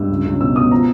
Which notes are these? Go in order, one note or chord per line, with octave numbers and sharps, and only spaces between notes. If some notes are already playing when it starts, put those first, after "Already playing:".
Already playing: G2 E6
C#2
C#2
B2 E6
B2 D#6
F3 A#5